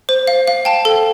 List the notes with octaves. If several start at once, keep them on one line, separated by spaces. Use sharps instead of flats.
C5
F5
F5
G5 A5
A4